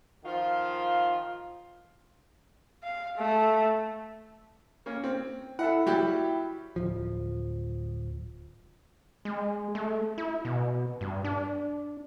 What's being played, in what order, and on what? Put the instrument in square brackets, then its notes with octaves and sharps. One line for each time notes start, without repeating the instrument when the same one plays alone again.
[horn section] D#3 F3 F4
[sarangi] F5
A3
[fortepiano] A#3 C#4
C4
[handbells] E4 E5 [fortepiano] A4 F#5
[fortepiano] F#3 G3 G4
[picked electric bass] D1 F3
[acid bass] G#3
A3
E4
B2
G2
D4